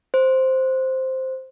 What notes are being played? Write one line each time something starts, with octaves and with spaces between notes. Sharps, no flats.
C5